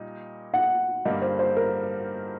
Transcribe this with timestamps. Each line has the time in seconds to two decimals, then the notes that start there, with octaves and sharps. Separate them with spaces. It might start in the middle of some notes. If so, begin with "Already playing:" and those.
Already playing: A#2 G3 D#4
0.54 F#5
1.05 G2 D3 G3 A#3 D#5
1.22 C5
1.39 C5
1.57 A#4